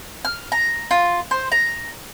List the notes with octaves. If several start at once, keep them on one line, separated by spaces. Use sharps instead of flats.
F6
A#5
F4
C5
A#5